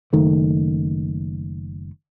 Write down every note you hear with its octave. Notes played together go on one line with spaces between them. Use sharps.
F#1 D#3 A3